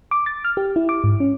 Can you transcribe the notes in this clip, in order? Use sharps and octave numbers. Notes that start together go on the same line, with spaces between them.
D6
A6
F6
G4
E4
D6
G#2
C#4